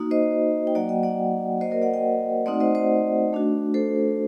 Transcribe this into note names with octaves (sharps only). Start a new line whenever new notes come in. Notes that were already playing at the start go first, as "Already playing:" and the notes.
Already playing: A#3 D#4 F#4
C5 D#5
G5
F#3 A#3 F#4 D5 F#5
D#5 G5
D5 F#5
A#3 F#4 C5 D#5
A#4 D5
D5 F#5
D#5 G5
A3 C4 D#4 F#4 D5 F#5
C5 D#5
C5 D#5
A3 D4 F#4
A4 C5